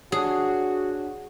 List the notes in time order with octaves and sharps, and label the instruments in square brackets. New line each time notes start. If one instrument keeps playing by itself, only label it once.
[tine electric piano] D4 C#5 [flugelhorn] F#4 [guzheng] G#4